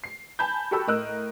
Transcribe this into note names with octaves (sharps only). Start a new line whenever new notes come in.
C7
G#5 A5 B5 G6
F#4 G4 A4 B5 E6
A2 A#4 D#5 E6 F#6